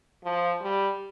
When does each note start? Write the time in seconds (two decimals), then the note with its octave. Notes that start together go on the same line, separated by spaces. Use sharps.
0.24 F3
0.62 G3